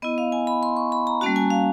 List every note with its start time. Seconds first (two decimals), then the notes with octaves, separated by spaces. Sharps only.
0.02 B3 E4 D#5
0.18 F5
0.32 G#5
0.47 B5
0.63 C6
0.77 C#6
0.92 B5
1.07 A#5
1.21 G3 A#3 C#4 F#4 A5
1.36 G#5
1.50 F5